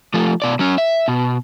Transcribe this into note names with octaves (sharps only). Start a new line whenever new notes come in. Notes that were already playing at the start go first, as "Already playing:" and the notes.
F3 A3
B2 D5
F#3 C#4
E5
B2